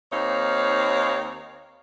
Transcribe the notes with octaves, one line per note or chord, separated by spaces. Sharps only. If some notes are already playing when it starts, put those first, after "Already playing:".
D#2 C4 D#4 C#5 F5